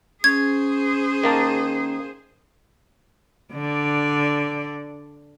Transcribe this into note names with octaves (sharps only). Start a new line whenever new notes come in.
C#4 G#4 C5 G#6
D#3 A#3 A5
D3 D5